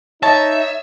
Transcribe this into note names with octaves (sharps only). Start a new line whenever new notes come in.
D#4 C#5 D#5 E5 A5